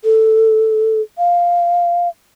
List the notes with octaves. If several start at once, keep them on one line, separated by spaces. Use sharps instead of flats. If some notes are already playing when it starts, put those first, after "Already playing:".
A4
F5